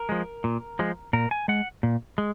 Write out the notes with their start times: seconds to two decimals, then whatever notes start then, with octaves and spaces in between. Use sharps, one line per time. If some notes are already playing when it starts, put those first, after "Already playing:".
Already playing: A#4
0.09 F3 G#3
0.44 A#2
0.79 F3 G#3
1.13 A#2 A#4
1.31 G#5
1.48 G#3 F#5
1.83 A#2
2.18 G#3